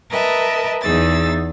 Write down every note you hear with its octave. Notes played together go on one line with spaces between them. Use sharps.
A#4 B4 D#5 E5 A5
E2 D#4 G#4 E6 A6